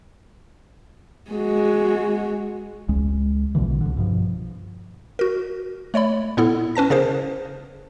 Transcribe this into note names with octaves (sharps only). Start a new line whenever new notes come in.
G#3 F#4
C#2 G#3
A#1 B2 D3 E3
C2 D3
G2 B2 F3
F#4 A#4
A3 C#5 D5 B5
A#2 B3 E4 A4
C#4 B4 A5 A#6
C#3 G#4 A#4 C5